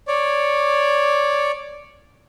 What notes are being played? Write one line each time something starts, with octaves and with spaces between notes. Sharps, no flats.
C#5 D5